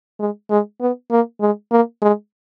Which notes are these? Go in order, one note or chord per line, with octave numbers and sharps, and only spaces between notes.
G#3
G#3
B3
A#3
G#3
A#3
G#3